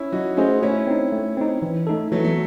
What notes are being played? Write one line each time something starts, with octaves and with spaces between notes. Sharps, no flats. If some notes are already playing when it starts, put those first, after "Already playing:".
Already playing: C#4 E4
F#3 D#4 F#4
A3 C#4 D#4 F#4 G#4 C5
A3 C#4 E4
C4 D#4
A3
C4 D#4
E3
A3 D#4 A4
E3 F#3 A3
F#3 A3